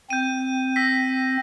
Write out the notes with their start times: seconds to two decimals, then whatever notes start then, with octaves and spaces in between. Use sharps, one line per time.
0.10 C4 G6 D#7
0.76 E6 A#6 B6